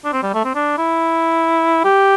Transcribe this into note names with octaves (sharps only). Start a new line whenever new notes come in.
D4
C4
G3
A3
C4
D4
E4
G4